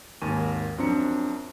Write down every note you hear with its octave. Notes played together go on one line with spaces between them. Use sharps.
G#1 D#2 A#4 G#5 C#6 D#7
F#2 F3 C4 D4 A#5 C#7